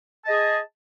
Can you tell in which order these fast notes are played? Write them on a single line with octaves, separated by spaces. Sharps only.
A5 D#5 G#4